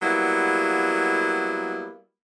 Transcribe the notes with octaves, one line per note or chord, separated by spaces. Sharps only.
F#3 G3 A#3 B3 E4